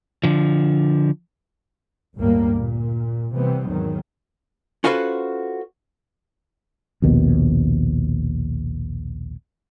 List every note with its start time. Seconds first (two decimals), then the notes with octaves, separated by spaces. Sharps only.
0.23 D3 F3
2.17 G1 D2 A2 G3 A#3
2.54 A#2
3.33 C3 E3 G3 B3 C4
3.67 G#1 E2 D#3 F#3
4.84 C#4 F4 F#4 A4 B4 C5
7.02 A#1 D#2 B2